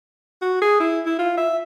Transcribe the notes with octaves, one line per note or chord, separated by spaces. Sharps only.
F#4
G#4
E4
E4
F4
E5